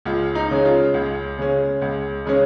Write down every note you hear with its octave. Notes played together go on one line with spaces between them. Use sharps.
C#2 F4
D#4
C#3 G#3 C#4
F4
C#2
C#3 G#3 C#4
C#2
C#3 G#3 C#4